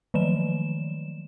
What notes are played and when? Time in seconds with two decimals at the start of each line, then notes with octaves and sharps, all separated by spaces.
0.14 D#3 F3 F#3 E7